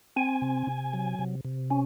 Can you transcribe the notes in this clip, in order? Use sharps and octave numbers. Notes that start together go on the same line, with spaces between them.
C4 G#5
C3
C3
F#3
C3
C3
C#4